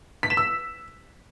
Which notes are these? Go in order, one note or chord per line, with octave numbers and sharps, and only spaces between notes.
B6
E7
E6